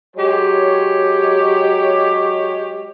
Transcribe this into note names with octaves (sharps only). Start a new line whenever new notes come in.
F#3 G#3 G4 C#5